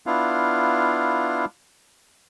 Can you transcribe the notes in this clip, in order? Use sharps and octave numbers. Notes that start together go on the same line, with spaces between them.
B3 D4 E4 F4 F5